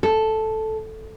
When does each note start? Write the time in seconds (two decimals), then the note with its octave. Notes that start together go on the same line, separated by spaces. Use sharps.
0.03 A4